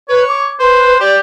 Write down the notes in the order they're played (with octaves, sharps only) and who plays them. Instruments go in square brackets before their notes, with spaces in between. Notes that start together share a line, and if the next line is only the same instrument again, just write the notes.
[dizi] B4 [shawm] C#5
[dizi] D6
[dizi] B4 [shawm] C5
[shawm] G4 [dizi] D5